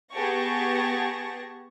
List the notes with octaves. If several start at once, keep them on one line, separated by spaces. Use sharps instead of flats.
B3 G4 G#4 A5 C#6 A#6